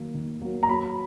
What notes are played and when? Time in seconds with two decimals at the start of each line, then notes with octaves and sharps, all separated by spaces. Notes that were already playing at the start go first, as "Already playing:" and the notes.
Already playing: D#3 F#3 A#3
0.14 D#3
0.42 F#3 A#3
0.63 A#5
0.69 F#3 B5